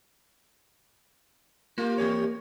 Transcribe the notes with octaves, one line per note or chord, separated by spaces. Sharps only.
A#3 F4 G4
E2 G4 C#5